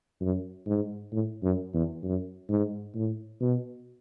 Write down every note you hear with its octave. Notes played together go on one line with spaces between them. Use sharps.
F#2
G#2
A2
F#2
E2
F#2
G#2
A2
B2